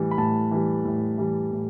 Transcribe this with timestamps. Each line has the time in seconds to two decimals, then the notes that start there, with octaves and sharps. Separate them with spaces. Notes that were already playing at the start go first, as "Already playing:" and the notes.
Already playing: A2 E3 G3
0.11 B5
0.18 A2 A5
0.51 E3 G3
0.85 A2
1.18 E3 G3
1.51 A2